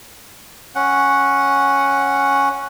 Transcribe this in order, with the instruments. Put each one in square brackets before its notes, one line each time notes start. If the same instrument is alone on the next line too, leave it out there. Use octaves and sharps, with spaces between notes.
[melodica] C#4 F#5